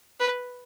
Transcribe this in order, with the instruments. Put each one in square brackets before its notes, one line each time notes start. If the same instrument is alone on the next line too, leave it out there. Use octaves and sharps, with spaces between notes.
[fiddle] B4